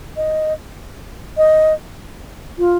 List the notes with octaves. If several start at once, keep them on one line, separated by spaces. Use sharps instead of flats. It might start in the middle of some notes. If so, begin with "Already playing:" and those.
D#5
D#5
F4